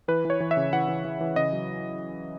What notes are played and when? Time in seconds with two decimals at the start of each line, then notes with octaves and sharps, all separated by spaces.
0.08 E3 B4
0.25 E3
0.30 C#5
0.40 E3
0.51 E5
0.57 C#3
0.73 E3 F#5
0.88 E3
1.05 E3
1.21 E3
1.36 C#3 D#5
1.53 F#3